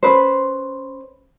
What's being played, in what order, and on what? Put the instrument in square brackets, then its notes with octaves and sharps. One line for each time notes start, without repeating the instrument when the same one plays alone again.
[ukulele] C#4 B4 C5